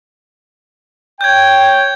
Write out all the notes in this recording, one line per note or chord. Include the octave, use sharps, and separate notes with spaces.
C#5 G5 G6 G#6